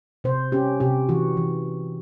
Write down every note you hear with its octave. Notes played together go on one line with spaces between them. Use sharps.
C3 C5
C#4 G4
C3 G4
E3 F#4
E3